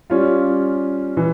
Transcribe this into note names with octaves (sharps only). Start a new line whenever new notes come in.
G3 C#4 F4
E3